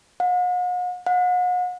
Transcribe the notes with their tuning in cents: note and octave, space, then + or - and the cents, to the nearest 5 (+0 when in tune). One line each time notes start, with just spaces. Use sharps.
F#5 -45
F#5 -40